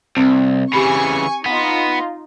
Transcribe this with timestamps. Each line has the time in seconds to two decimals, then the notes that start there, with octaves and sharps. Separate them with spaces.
0.17 C2 C4
0.73 C#3 E3 G4 G#5 B5 C#6
1.46 B3 D#4 F4